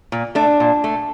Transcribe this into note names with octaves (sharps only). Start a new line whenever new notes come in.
A#2
A3 D4
A#2
A3